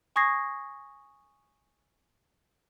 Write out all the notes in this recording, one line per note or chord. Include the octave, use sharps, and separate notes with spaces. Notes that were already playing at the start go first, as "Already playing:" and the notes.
G#5 C#6 D#6 G#6 A#6 C7